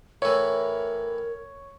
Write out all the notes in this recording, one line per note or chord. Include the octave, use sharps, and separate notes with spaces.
A2 E3 A#4 C#5